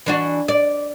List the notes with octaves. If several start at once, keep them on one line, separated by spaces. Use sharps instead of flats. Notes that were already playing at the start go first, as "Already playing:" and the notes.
E3 D4 F#4
D5